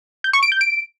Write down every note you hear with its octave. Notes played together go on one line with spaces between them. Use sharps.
G6
C#6
D7
G6
D7